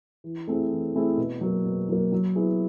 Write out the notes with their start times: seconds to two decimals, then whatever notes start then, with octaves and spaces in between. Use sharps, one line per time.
0.24 E3
0.48 A3 C4 E4 G#4
0.71 E3
0.95 A3 C4 E4 G#4
1.17 B2
1.41 F#3 A#3
1.65 B2
1.89 F#3 A#3
2.12 F#3
2.35 B3 E4 G#4